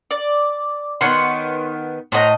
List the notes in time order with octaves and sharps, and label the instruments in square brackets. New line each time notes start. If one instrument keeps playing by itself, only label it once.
[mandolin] D5
[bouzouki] D#3 B3 [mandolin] C#5 F#5 C6
[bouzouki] A2 D#5 [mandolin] C5 F#5 A#5